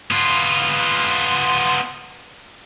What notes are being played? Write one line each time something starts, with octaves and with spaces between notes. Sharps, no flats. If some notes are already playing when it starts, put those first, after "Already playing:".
B3 F4